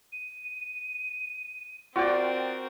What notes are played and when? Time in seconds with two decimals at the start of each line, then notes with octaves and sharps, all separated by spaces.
0.12 D#7
1.96 C4 F4 F#4 A#4 D5 G5